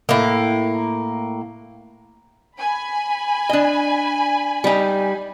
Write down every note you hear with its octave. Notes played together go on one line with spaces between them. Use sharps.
A2 A#3
G#5 B5
D4 D#5
G3 D#4